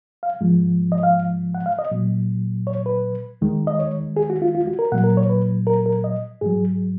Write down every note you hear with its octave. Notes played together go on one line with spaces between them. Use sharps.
F5
G#2 F3 G#3
D#5
F5
F#5
F5
D#5
A#2 F#3
C#5
B4
D#2 D#3 G#3
D#5
C#5
G#4
F#4
F4
F4
F#4
A#4
A#2 F#3 F#5
A#4
C#5
B4
A#4
A#4
D#5
G#2 F#3 G#4